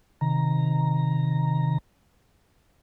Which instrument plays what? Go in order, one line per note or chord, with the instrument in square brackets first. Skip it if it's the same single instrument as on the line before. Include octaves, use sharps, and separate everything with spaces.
[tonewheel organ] C3 D#3 A#5